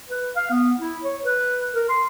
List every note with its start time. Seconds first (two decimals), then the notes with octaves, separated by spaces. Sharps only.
0.09 B4
0.36 F5
0.51 B3
0.79 E4
1.03 C#5
1.25 B4
1.74 A#4
1.89 C6